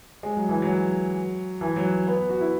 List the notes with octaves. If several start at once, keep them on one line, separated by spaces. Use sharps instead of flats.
G#3
F#3
E3
F#3
E3
F#3
B3
F#4
E4